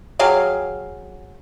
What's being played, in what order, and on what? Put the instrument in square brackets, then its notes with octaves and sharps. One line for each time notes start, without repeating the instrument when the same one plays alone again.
[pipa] F#3 G4 G#4 F5